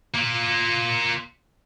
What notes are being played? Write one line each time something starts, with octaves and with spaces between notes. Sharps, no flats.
A#3 F4